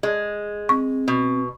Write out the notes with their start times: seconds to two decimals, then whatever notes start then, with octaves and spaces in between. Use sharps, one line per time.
0.03 G#3
0.69 C4 C#6
1.08 B2